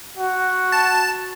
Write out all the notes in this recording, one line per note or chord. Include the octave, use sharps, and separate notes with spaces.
F#4
A5